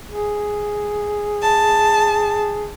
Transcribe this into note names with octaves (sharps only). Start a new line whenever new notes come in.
G#4
A5